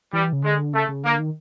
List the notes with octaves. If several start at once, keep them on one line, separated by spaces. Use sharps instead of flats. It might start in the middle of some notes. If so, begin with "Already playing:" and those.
E3 G3
C#3
D3 G#3
C#3 A3
C#3
D3 A#3
D#3